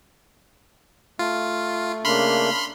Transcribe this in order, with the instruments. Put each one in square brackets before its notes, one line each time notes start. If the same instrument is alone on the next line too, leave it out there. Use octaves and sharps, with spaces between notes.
[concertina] A3 [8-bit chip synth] F4
[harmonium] C#3 A#3 D4 [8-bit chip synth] B5 C6 F6